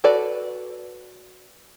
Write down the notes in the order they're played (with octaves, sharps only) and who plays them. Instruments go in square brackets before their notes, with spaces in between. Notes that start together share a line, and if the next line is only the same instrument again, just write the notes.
[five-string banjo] F#4 A4 B4 D5